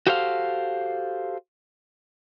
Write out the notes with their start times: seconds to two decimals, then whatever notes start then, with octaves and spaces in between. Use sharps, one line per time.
0.07 F#4 G4 A4 C5 D#5 F5